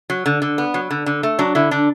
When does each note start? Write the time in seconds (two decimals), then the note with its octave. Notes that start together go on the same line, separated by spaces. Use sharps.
0.10 F#3
0.26 D3
0.42 D3
0.58 B3
0.74 F#3
0.91 D3
1.06 D3
1.23 A3
1.39 F#3 D4
1.55 D3 E4
1.71 D3 D4